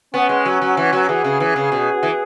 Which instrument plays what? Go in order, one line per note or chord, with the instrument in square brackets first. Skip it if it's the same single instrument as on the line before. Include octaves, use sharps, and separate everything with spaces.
[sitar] B3 [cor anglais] C#4
[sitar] G#3
F#3
F#3
E3
F#3
[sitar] E3 [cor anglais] G#4
[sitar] C#3
E3
C#3
B2
E3